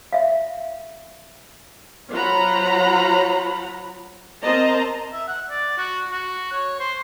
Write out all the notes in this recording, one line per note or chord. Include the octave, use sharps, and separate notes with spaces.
E5 F5
F#3 F4 C5 F#5 A#5 B5
C4 A#4 C5 D#5 A5 A#5
E5
F#5
D5
F#4
F#4
C#5
C5